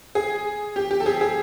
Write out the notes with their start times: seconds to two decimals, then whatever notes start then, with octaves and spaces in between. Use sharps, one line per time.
0.15 G#4
0.76 G4
0.91 G4
1.00 A4
1.06 G#4
1.21 G#4